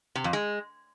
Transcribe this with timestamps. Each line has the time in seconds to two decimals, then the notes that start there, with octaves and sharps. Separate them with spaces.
0.15 C3
0.24 F2
0.33 G#3